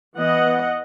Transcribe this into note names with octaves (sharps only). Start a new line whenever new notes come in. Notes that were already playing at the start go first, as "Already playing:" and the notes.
E3 B3 D#5 F#5